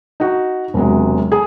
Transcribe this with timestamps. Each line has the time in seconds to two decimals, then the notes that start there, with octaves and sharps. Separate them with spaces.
0.20 D#4 F#4
0.74 E1 C3 F#3 G#3
1.32 G#4 G#5